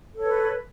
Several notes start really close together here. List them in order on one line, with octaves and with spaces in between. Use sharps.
A4 C#5 B4